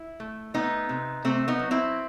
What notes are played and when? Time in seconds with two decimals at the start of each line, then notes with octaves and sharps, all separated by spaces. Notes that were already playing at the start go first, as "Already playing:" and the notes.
Already playing: E4
0.20 A3
0.54 A3 B3 D#4
0.89 C3
1.24 C3 A3 C4
1.48 B3 D#4
1.59 F#3
1.71 C4 E4